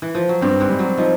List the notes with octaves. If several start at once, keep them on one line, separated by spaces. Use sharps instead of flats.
E3
F3
F#3
G2 G3 C4
G#2 G#3
G3
F#3
F3 D#4